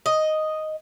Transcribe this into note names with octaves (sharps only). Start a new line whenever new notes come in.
D#5